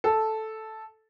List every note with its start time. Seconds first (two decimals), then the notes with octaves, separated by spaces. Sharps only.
0.04 A4